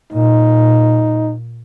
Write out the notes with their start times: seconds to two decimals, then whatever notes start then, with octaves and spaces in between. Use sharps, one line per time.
0.13 A#2 D#4